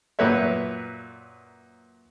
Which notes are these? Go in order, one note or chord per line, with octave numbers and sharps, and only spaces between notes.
F#2 A#2 B4 C#5 E5